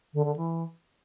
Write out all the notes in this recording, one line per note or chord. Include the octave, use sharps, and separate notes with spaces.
D3
D3
E3